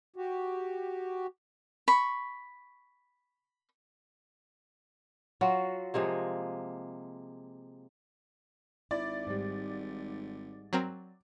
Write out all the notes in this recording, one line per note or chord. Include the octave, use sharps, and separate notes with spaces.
F#4 G4
B5 C#6
F#3 F4 F#4
C3 F3 G#3 A#3
G#1 E4 D5
G#2 G3
F#3 C4 A#4